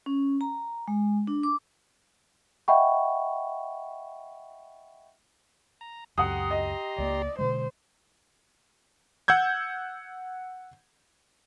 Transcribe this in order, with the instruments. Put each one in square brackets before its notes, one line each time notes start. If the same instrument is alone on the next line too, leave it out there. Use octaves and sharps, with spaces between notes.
[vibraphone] C#4
A#5
G#3
D4
D6
[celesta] D#5 E5 F#5 G5 B5 C#6
[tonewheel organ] A#5
[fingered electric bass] C#2 F#2 [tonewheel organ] G4 A#5 C6 [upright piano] F#5 D#6
[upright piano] D#5
[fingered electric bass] C#2 A3 A#3 [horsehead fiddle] D5
[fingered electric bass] B2 D3 G#3 [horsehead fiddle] C5
[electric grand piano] F#5 E6 G6 G#6